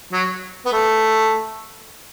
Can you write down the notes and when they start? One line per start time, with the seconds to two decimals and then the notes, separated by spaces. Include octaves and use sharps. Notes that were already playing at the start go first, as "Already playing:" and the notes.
0.13 F#3
0.65 B3
0.73 A3